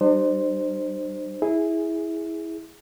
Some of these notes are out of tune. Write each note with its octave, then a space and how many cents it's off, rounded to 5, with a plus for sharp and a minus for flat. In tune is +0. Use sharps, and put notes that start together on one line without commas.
G3 -20 D4 +45 C5 +0
E4 -10 G#4 +0